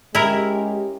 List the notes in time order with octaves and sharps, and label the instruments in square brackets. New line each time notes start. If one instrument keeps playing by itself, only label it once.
[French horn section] G#3 C#4 G4 [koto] E4 A#4